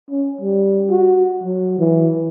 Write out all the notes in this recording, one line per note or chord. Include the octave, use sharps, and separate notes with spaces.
C#4
G3
F#4
F#3
E3